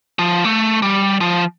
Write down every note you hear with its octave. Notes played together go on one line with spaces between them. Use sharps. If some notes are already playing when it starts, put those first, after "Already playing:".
F3
A3
G3
F3